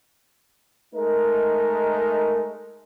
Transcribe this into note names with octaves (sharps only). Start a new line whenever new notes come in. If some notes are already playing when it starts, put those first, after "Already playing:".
G#3 A3 D#4 A#4